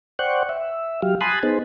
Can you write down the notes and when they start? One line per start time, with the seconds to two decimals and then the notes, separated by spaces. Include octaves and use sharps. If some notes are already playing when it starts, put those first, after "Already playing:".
0.19 C5 D5 F#5 G5 C#6 F#6
0.49 E5
1.02 F#3 G4 F5
1.21 G#5 A5 B5 C6 D#6 F#6
1.43 B3 D#4 G#4 C5